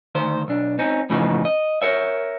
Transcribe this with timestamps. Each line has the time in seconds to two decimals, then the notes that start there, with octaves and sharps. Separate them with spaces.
0.15 D2 D#3 C5
0.48 B1 D4
0.79 C4 C#4 D#4
1.10 F#2 A2 C#3 E3 F3 D#4
1.45 D#5
1.82 A#4 C#5 E5